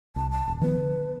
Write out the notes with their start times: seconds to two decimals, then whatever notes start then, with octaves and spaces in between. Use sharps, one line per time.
0.16 C2 A5
0.31 A5
0.47 D#1
0.61 D#3 F3 B3 B4
0.78 D3